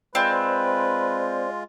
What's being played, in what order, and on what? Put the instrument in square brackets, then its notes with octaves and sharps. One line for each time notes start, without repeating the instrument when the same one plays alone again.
[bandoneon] G#3 F4 [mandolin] C4 [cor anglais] B4 [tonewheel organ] C5 D5